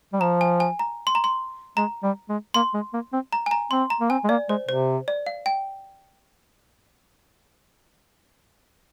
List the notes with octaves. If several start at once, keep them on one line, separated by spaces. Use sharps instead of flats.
G3
F3 A#5
G#5
G#5
A#5
C6
A#5
C6
G#3 A#5
G3
G#3
A#3 C6
G#3
A#3
C4
A#5
G#5
A#5
C4 C6
A#5
A#3
C4 G#5
G#3
A#3 D5
G#3 C5
C3 C5
D5
F5
G5